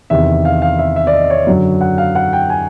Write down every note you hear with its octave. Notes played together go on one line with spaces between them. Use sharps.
E2 C3 D#3 E5
F5
F5
E5
E5
D5
D#5
C#5
F#2 D3 F#3
F#5
F5
F#5
G5
G#5